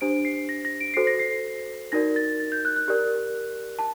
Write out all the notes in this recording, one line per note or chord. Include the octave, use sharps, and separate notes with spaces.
D4 G4 C5 D7
C7
A#6
A#6
D7
F#4 A4 C5 C7
A#6
C7
D#4 F#4 A#4 D5 A#6
A6
A6
G6
F#6
F#6
G4 A#4 D5
A5